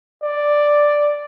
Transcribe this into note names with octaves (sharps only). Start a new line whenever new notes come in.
D5